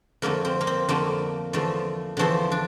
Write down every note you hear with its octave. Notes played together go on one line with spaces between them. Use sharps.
F2 D3 A3 A#3
C4
A#3
C4
F2 D3 A3 A#3
E2 D3 F3 A3
E2 D3 F3 A3 C4
D4